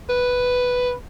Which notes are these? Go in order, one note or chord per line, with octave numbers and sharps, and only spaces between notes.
B4